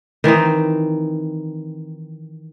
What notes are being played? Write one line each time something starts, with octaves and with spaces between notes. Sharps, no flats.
D#3 E3 C4 D#4